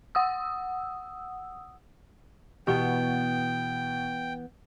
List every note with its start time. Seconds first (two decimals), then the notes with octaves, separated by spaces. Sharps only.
0.15 F#5 D#6 E6
2.67 B2 E3 B3 G4 G5 C#6 G7